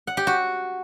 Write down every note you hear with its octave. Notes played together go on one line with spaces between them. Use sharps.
F#5
G4
F#4